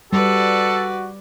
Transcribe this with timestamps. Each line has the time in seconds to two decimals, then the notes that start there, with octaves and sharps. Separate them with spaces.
0.13 G3 F#4 A4 B4 D5